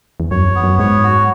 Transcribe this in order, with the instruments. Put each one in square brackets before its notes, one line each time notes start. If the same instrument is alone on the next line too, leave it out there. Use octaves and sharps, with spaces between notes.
[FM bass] E2
[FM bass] F#2 [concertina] C#5
[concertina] B3
[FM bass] F#2
[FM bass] G#2 [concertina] C#5
[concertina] F#4